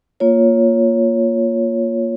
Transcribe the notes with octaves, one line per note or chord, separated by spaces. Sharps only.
A#3 F4 C#5